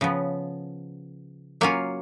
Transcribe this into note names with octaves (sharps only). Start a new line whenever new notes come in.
C#3 F3 B3
F#3 A#3 C#4 F4